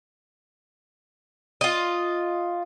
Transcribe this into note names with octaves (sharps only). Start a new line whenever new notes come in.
F4 D#5